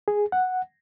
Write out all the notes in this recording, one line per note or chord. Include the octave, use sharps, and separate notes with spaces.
G#4
F#5